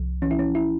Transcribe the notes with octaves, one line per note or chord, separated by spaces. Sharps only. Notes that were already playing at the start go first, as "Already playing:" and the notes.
Already playing: C2 F3
E3 C#4
E4
C#4
E4